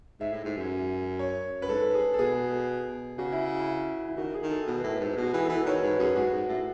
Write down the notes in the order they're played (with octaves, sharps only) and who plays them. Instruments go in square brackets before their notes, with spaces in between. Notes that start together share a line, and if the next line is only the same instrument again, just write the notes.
[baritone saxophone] G#2 [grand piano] E5
[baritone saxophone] A2
G#2
F#2
[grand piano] C#5
[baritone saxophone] F#2 [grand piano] B4
[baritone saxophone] G#2 [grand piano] A4
[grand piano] G#4
A4
[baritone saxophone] B2 [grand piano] G#4
[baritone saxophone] C#3 [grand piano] F#4
[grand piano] E4
E4
E4
[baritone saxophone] D#3 [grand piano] F#4
[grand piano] G#4
[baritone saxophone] D#3
[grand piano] A4
[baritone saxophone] B2 [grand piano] B4
[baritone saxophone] A2
G#2
B2
[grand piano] F#4
[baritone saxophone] E3 [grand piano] G#4
[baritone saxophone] E3 [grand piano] A4
[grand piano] B4
[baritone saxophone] D#3 [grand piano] C#5
[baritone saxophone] G#2 [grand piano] B4
[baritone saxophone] F#2 [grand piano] G#4
[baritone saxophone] G#2 [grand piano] F#4
[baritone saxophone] G#2
A2